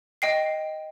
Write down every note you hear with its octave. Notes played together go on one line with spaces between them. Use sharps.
D#5 G5 C7